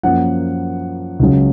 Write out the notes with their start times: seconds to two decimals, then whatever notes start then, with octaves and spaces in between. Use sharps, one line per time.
0.03 F#2 F3 A#3 F#5
1.19 C#2 C#3 F#3